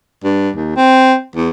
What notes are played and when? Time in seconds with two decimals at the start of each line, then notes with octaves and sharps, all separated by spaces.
0.24 G2
0.55 D#2
0.76 C4
1.35 E2